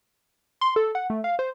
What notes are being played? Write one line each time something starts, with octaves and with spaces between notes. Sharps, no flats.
C6
A4
F#5
A3
F5
C5